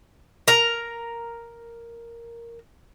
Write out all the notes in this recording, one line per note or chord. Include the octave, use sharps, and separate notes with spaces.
A#4 A#5